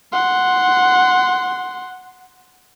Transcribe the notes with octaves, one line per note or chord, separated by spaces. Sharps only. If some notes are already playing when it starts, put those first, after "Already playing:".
F#5 C6